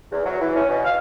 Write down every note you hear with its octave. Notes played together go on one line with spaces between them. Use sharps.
E2
F#3
E3
C#4
B2
F5